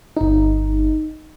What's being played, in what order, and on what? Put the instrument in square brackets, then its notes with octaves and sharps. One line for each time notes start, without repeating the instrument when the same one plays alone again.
[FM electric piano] G1 D#4